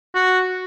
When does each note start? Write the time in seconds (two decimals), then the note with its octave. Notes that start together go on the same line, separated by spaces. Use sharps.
0.15 F#4